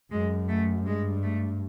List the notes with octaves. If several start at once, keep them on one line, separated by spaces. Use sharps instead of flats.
F#2 G#3
A3
G2 G#3
A3